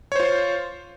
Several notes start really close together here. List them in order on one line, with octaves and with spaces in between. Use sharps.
C#5 C5 F4